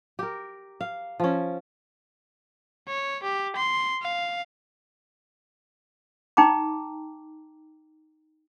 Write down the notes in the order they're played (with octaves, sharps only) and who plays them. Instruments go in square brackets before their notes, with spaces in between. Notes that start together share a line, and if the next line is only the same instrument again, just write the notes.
[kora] G4 A#4
F5
F3 C#4
[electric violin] C#5
G4
C6
F5
[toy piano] D#4 G5 A#5 D6